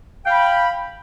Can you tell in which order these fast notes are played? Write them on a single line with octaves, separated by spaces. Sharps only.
G5 F5 B5